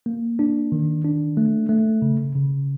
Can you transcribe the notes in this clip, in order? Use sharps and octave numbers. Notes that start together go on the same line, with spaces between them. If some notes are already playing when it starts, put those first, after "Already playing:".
A#3
D4
D#3
D4
A3
A3
C#3
C#3